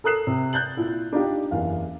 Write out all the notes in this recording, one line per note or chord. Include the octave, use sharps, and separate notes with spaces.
A4 A#4 D#6 F#6 C7 E7
C3
F#6 G6 A6 F#7
A#2 E4
D4 D#4 F4 G4
F#1 E2 F5